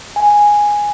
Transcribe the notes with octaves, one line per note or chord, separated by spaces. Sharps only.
G#5